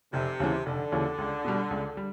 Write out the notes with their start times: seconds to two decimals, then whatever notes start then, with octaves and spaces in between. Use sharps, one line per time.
0.13 F1 C3
0.40 D#2 C#3 E3
0.65 F1 D3
0.92 D#2 C#3 E3
1.18 C#2
1.44 B2 G3
1.71 C#2
1.97 G3